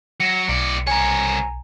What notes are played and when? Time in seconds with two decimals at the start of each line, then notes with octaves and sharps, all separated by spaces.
0.20 F#3 C#7
0.48 B1 A2 D5
0.87 C2 C#5 G#5 A#5